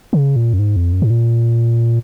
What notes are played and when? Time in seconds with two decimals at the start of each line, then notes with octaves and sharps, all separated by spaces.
0.13 C#3
0.36 A#2
0.53 F#2
0.59 G#2
0.76 F2
0.93 F#2
1.02 G#2
1.10 A#2